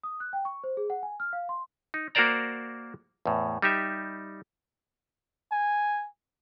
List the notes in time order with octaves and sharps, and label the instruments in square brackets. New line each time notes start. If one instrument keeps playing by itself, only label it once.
[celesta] D#6
F#6
G5
C#6
C5
G#4
F#5
G#5
F6
F5
C6
[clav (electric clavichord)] D#4
A#3 F#4 A#4 C5 D5 A#5
E2 A2
G3 D#4 G4 E5
[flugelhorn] G#5